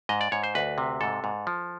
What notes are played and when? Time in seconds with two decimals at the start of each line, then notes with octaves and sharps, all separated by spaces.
0.09 G#2 D#5
0.21 D5
0.32 G#2 C#5
0.44 C5
0.55 D2 B4
0.78 C3
1.01 G#2 A4
1.24 G#2
1.47 F3